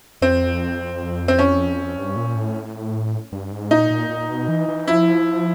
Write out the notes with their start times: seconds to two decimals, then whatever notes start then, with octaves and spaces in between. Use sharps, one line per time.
0.22 F2 C4
1.28 C4
1.39 C#4
1.97 G2
2.16 A#2
2.35 A2
3.32 G2
3.52 G#2
3.71 A#2 D#4
3.90 A#2
4.09 A#2
4.30 B2
4.48 E3
4.68 E3
4.88 F3 E4